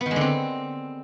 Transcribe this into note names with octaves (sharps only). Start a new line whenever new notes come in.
B3
D#3
G#3
D3
C4